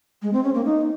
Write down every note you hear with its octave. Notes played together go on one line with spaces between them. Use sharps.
G#3
C4
C#4
A#3
D#4